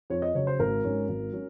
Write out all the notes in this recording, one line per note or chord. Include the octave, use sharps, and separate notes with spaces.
F2 C#5
D#5
C#3 F#3 C#5
C5
G#1 A#4
G#2 F#3 C#4
G#1
F#3 C#4